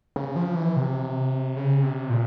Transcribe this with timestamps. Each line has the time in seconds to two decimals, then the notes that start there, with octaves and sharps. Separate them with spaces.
0.16 C#3
0.36 F3
0.55 E3
0.76 C3
1.57 C#3
1.83 C3
2.10 A#2